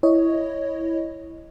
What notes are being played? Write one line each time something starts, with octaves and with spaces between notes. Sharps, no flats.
E4 C#5 D#5